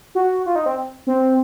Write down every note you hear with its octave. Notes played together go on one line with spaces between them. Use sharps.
F#4
F4
D#4
C4
C4